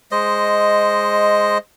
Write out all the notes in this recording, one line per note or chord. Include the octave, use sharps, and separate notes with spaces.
G#3 C5 D#5